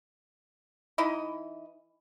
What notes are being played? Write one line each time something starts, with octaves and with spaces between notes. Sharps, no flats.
E3 D#4 E4 D#5